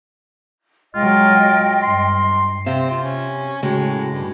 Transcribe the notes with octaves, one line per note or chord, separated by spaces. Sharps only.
F#3 G#3 F4 D#5 G5
G2 C6
C3 C4 E5 F5
F4
C#4
A2 C#3 G#3 F#4 G5
G2